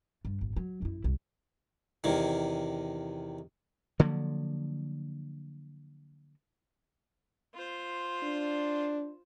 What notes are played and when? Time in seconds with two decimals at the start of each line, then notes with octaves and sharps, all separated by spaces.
0.25 G2
0.41 G#1
0.56 F#3
0.82 F#2 E4
1.04 C2
2.04 E2 C3 D#3
3.99 D3 F3 F#3 A#3
7.54 F4 C5
8.24 D4